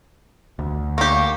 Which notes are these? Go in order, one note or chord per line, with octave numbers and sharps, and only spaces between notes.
D2
A#3 G4 C#6